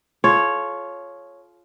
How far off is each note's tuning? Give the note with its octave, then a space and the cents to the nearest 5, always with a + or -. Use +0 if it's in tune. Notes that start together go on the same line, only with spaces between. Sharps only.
F4 +0 A4 -45 C#5 +0